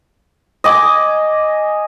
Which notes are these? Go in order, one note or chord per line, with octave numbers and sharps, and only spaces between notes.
D#5 G#5 D6